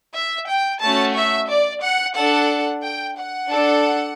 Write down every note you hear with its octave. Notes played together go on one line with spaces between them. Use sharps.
E5
G5
A3 C#4 F#4 A5
E5
D5
F#5
D4 A4 F#5
G5
F#5
D4 A4